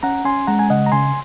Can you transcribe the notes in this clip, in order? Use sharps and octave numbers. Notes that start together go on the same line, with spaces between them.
C#4 F#5 A#5
C#4 G#5 C6
G#3 F#5 A#5
G#5
C#3 D#5 F#5
A#5
C#3 G#5 C6